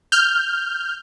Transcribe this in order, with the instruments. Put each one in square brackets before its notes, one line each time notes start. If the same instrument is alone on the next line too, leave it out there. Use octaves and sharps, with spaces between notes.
[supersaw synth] F6 G6